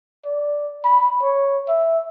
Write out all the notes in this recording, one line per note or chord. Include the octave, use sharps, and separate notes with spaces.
D5
B5
C#5
E5